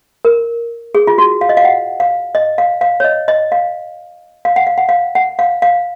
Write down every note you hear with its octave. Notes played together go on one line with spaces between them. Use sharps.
A#4
G#4
F4
F#4
F5
D#5
F5
F#5
F5
D#5
F5
F5
C#5
D#5
D#5
F5
F5
F#5
F5
F#5
F5
F#5
F5
F5